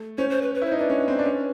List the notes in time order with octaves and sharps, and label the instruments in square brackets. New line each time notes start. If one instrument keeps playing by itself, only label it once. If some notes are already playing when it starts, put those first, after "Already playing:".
Already playing: [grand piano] A3
[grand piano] C#4 [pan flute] C5
[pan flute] C5
B4
B4
[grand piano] E4 [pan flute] C5
[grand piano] D#4
[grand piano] D4 [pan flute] B4
[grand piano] C#4
C4
D4
C#4